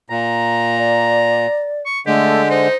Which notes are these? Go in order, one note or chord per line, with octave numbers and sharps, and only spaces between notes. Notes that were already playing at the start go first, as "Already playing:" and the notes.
A#2 A#5
D5
C#6
D3 G#3 A3 G4
D#4 C5